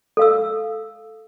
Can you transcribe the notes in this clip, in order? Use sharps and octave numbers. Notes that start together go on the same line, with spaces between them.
A4 F5 E6